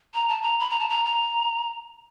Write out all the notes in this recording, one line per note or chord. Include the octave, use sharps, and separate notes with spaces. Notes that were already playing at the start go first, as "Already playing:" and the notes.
A#5
A5
A#5
B5
A#5
A5
A#5
A#5